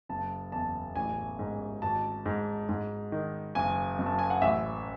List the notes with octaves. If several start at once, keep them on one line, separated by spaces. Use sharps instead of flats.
F#1 A5
E2 A5
A1 G#5
G#2
G#1 A5
G#2
G#2
D#3
F#1 G#5
F#2
A5
G#5
F#5
A1 E5